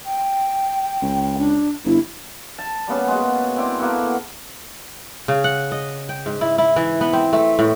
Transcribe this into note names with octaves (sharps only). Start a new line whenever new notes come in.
G5
C#2
D4
G1 E4
A5
G3 A#3 B3 C#4
G#3 F#4
C4 E4 D5
A#3 B3 F#4 A4
C#3
F#5
D#5
G5
G#2
E4
E4
E3
B3
C4
A3
A2